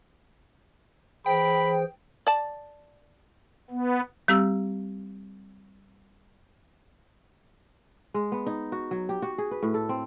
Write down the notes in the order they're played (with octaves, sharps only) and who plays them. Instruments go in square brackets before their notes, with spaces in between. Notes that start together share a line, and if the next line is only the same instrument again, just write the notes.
[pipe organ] E3 G#4 C5 [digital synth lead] G5 [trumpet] B5
[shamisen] D5 A5
[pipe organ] B3
[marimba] G3 C4 G4 E6
[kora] G#3
B3
D#4
F#4
F#3
G4
F#4
G#4
B4
A2
A4
C4